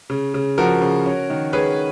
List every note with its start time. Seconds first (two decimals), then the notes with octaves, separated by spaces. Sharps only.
0.10 C#3
0.34 C#3
0.58 F3 F#4 A#4
0.81 C#3
1.06 C#4
1.30 D#3
1.53 C#4 G#4 B4